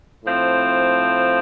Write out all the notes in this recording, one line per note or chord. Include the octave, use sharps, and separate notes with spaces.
A2 F3 C4